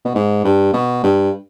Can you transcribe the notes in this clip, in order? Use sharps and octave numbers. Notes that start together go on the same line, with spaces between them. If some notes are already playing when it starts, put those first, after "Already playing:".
B2
G#2
G2
B2
G2